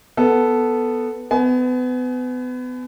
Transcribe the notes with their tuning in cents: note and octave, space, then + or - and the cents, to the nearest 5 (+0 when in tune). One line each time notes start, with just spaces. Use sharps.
B3 +0 A4 +0
B3 +30 G#5 +35